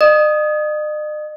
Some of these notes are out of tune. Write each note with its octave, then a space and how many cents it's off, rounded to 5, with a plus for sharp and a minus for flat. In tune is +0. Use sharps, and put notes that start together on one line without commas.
D#5 -45 D#6 +0